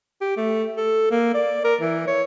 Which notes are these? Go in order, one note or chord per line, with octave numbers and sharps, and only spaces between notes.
G4
A3
A4
A#3
D5
A#4
E3
C#5